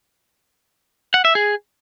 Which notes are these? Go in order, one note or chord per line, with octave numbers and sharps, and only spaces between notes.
F#5
E5
G#4